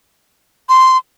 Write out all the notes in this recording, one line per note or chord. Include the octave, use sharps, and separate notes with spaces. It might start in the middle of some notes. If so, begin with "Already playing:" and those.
C6